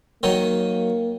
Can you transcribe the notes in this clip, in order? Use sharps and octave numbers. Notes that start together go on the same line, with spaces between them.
D#3 F#3 A#3 D#4